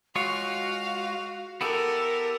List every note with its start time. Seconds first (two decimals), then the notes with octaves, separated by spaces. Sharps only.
0.16 G#3 F4 F#4 C#5 F5
1.61 B3 E4 G4 A4 A#4